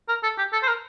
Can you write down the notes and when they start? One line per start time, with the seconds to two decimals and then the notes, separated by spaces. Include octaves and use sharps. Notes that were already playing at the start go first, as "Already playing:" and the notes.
0.08 A#4
0.23 A4
0.38 G4
0.53 A4
0.63 C5
0.68 A#4